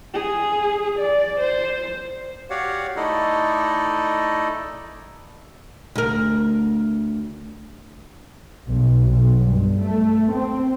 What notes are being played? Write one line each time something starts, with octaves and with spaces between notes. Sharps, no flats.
G#4
D5
C5
F#4 G4 C#5 D5 F5 F#5
A3 D#4 E4 A4 D5 D#5
D2 A#4
B1
B1
G2
A3
C4